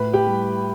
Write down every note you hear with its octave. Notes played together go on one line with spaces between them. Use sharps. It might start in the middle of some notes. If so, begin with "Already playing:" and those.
Already playing: A2 B4 B5
G4 G5
G3